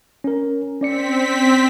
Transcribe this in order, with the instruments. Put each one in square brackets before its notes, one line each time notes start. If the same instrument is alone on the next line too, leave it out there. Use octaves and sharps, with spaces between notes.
[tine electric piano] C#4 A#4
[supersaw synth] C4 B6 [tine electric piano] C#4 D5 C#7